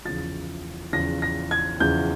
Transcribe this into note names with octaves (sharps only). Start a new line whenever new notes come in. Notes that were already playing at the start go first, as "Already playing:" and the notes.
E2 C#3 F3 A6
E2 C#3 F3 A#6
A#6
G#6
E2 C#3 F3 G6